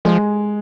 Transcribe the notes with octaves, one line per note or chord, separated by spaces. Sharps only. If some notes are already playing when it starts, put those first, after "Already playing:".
F3 G#3